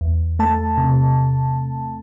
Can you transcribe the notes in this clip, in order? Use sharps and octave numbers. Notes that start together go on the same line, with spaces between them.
E2
A3 A5
C3